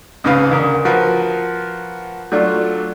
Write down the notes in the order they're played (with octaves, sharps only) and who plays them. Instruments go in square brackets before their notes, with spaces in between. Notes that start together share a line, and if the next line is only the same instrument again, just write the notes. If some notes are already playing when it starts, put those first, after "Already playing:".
[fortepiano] C#2 G#2 C#3 B4 F5
D2 A#4
F3 F4 F#4 A#4 B4
F#3 A3 D4 F4